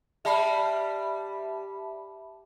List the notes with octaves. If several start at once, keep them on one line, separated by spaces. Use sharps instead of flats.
G3 E5 A5 B5